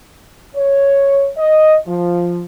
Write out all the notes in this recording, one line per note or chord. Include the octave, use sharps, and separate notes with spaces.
C#5
D#5
F3